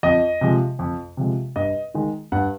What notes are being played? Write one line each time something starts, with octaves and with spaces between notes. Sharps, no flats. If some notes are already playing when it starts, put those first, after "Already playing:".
F2 D#5
C3 F3 G#3
F2
C3 F3 G#3
G2 D#5
D#3 G#3
G2 F#5